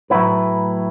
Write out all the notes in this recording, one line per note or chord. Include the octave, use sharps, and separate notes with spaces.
A2 F#3 A3 E4 B4